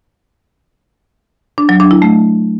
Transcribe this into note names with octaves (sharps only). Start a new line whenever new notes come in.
D4
F#3
D4
E4
A3